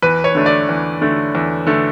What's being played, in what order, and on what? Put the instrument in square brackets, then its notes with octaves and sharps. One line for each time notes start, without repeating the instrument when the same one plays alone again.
[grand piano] E2 B4
C#5
D3 A3 D4
D5
E2
D3 A3 D4
E2
D3 A3 D4